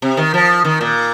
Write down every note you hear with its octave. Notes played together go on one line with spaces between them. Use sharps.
C3
D#3
F3
D#3
A#2